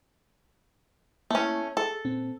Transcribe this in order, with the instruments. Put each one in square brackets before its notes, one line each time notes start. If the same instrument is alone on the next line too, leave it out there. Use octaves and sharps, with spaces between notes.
[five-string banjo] A3 C#4 [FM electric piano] A#3 E4
[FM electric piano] G#4 [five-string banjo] A4
[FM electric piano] A#2 C4